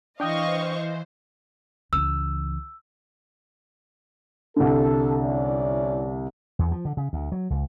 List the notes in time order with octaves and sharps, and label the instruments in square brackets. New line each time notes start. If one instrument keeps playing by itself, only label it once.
[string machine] E3 C5 [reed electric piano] D4 G5 D#6 [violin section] D#5 F5 C#6
[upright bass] C#2 E3 [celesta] E6
[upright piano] C2 D3 [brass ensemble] A4
[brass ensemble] C#4 E4 D5
[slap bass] E2
F3
D3
C#3
D2
F#3
C#2